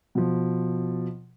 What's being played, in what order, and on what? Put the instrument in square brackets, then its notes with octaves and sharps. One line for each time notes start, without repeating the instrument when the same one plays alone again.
[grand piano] B2 F3